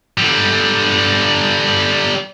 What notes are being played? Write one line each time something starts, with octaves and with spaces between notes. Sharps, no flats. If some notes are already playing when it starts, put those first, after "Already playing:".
D3 G3